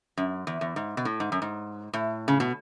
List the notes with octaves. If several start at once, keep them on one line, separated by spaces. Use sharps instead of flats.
F#2
E2
E2
G#2
B2
A2
G#2
F#2
G#2
A2
C#3
B2